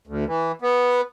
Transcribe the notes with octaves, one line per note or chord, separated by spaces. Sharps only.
D2
E3
B3